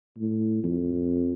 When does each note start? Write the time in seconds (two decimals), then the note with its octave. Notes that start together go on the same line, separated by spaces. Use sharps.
0.19 A2
0.64 F2